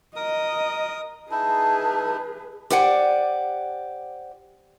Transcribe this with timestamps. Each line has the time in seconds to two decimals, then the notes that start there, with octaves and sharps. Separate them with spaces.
0.16 A#4 D#5 D#6
1.31 D#4 E4 G#4 B4 A5
2.70 G4 C5 D5 F#5 G#5